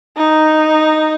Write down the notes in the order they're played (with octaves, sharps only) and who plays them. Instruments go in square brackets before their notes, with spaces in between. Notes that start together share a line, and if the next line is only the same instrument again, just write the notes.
[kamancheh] D#4